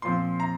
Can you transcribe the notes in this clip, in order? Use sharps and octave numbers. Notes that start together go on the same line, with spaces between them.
A#2 F3 C4 C6
A#5